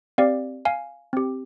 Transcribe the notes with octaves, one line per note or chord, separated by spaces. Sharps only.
C4 G4 D5 F5
F5 G#5
C4 G4